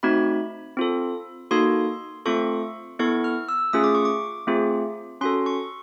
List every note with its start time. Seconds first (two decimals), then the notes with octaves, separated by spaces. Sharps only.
0.03 A3 C4 D#4 F#4 B5
0.77 C4 F4 A4
1.51 A#3 D#4 F#4 A4 C6
2.26 A3 C4 F4 A4 C#6
2.99 B3 E4 A4 C#6
3.24 F6
3.49 E6
3.73 A3 C#4 F4 G#4 D#6
3.84 D6
3.95 C#6
4.05 D6
4.47 A3 C4 F4 G#4
5.21 C#4 F#4 A4 C6
5.46 C#6